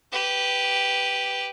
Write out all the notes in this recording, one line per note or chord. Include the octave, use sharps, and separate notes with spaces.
G4 B4